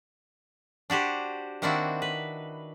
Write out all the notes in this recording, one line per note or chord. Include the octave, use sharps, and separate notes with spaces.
D4 F#4 G4 C5
D#3 A#3 C4 D4 E4 F#4
B4